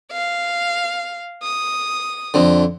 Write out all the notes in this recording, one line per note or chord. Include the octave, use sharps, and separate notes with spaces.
F5
D#6
F2 D3